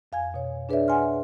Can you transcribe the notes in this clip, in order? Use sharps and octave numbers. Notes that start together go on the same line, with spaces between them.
F2 F5 G#5 G#6
B2 C#5
D4 G#4 B4 C#5 D5 E5
F#5 G#5 C6 F6